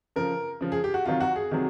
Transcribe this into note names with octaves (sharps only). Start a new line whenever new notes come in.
C#3 F3 A#4
C#3 F3
G#4
G4
F#4
C3 D#3 F#3 F4
F#4
G#4
C3 D#3 F#3